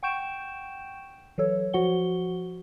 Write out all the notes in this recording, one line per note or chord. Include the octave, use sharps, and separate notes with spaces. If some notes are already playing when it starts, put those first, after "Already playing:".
F#5 G5 C#6 G6 D7 E7
E3 F#3 A4 C#5
F3 F#4 F#5 G7